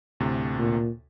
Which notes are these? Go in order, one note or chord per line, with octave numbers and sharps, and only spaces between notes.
D2 A2 C3
A#2